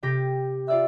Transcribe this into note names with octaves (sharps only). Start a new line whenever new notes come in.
C3 G4 A#6
F4 D5 E5 E6